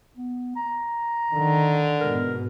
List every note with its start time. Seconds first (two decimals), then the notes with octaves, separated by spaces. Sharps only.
0.17 B3
0.56 A#5
1.33 D3 D#3
2.00 G#2 B2 A#4